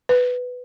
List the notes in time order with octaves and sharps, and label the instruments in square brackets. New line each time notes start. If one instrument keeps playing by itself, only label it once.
[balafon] B4